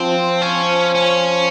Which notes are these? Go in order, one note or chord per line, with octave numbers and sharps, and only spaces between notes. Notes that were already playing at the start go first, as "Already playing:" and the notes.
Already playing: F3 C4
C#4
C#4